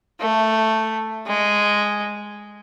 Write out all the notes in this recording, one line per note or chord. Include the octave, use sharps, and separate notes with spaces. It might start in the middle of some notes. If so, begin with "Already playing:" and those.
A3
G#3